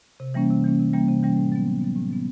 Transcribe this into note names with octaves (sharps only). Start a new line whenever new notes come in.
C3
E3 G3 A#3 C#4
C3
E3 G3 A#3 C#4
C3
E3 G3 A#3 C#4
C3
E3 G3 A#3 C#4
A2
F#3 B3
A2
F#3 B3
A2
F#3 B3